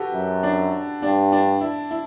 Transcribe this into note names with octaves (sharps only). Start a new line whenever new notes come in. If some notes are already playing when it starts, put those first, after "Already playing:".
Already playing: F#4 G4 A4 B4
F#2
D4
G2 D4
D4
E4
E4